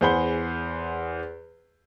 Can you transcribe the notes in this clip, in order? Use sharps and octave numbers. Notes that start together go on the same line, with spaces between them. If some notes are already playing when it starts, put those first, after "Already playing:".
E2 G#4 C5 F#5 B5 G7